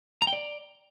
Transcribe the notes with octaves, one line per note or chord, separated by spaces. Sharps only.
A#5
G5
D5